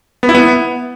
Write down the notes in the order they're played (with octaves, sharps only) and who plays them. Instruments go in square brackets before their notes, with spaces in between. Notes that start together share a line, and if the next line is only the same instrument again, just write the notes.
[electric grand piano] B3
E4
B3